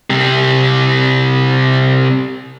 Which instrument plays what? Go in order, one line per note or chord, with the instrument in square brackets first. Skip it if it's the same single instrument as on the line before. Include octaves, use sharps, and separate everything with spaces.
[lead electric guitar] C3 G3